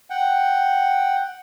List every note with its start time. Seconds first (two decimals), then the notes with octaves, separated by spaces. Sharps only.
0.10 F#5 G5